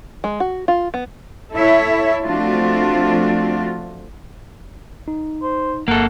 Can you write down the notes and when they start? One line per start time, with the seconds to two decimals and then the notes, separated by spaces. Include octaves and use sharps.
0.24 G#3
0.40 F#4
0.68 F4
0.94 B3
1.54 E4 A4 C#5 E5
2.24 F3 A3 C4 D4 F4 F#4
5.08 D#4
5.42 C5
5.88 G1 G2 A#3 A4 F#5